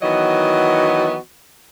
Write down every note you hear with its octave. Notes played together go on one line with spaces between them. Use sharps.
D#3 E3 F#3 B3 F#4 D#5